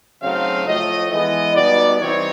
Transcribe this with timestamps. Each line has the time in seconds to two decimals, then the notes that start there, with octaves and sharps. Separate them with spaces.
0.23 C#3 F#3 A3 C4 D#4 F5
0.67 A2 F3 A3 D#5
1.12 E3 G#3 B3 D#5
1.56 B2 G3 B3 D#4 D5
2.00 E3 G3 C4 D#4 C#5